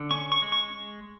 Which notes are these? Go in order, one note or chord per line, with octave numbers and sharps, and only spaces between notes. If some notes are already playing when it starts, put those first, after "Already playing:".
Already playing: D3
C#4 C#6
C#6
G#3
C#6